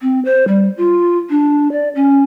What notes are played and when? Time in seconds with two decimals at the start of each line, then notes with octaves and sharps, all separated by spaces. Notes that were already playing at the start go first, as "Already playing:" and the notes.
0.01 C4
0.25 C5
0.48 G3
0.77 F4
1.30 D4
1.72 D5
1.95 C#4